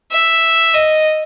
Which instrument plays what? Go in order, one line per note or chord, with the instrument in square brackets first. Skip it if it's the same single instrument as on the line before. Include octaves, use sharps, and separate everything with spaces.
[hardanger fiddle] E5
D#5